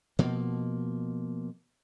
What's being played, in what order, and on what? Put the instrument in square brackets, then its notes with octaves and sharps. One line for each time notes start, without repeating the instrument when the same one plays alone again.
[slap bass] B2 F3 A#3